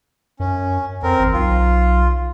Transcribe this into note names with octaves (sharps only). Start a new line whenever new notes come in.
F#2 C#4
F2 C4 A#4
G#1
B1 F4